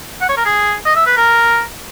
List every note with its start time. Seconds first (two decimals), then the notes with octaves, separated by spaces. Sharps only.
0.21 F#5
0.29 C#5
0.37 A#4
0.46 G#4
0.86 D#5
0.96 E5
1.07 B4
1.17 A#4